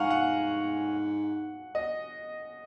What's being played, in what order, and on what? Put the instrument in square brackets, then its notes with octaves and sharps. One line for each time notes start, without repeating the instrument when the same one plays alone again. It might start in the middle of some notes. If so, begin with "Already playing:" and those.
Already playing: [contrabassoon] G#2 [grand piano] F5 F#5 G#5 A#5 C#6
[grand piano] F#5
D#5